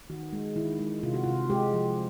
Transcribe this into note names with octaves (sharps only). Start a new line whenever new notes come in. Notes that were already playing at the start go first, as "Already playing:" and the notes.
D#3 F#4
G#3
D#3 E4
G#3
C3 F4
F#4
C3 F4
G#3 G4
F3